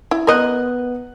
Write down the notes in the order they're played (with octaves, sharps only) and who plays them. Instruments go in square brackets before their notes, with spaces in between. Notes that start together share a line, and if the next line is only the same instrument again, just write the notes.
[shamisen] E4
[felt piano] B3 F#6 [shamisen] A#4 D#5